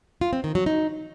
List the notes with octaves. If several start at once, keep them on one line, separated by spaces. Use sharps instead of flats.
F4
C4
D#3
F#3
D#4